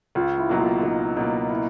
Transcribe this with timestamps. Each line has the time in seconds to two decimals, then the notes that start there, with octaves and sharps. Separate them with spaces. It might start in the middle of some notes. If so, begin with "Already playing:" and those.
0.15 C#2 F4
0.38 E4
0.49 B2 F#3 A#3
0.60 F4
0.83 C#2 D#4
1.17 B2 F#3 A#3
1.50 E4